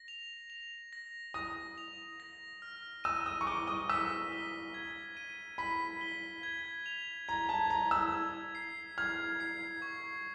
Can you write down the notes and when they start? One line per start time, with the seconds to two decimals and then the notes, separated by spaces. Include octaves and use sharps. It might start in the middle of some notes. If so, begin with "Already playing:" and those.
Already playing: A#6
0.08 F7
0.50 F7
0.93 A#6
1.34 D#6 A#6
1.78 F7
2.20 A#6
2.62 F6
3.04 E6 D#7
3.26 D#6
3.41 C#6
3.47 D6 G7
3.67 D#6
3.89 E6 B6
4.32 G7
4.74 G#6
5.17 D#7
5.58 B5 B6
6.01 G7
6.43 G#6
6.86 F7
7.28 A#5 G#6
7.49 A5
7.70 A#5 G#6
7.91 E6
8.12 G#6
8.55 C7
8.98 F6 G#6
9.40 C7
9.82 C#6